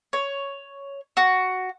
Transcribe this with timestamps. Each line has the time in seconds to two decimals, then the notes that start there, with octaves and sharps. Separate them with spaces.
0.13 C#5
1.17 F#4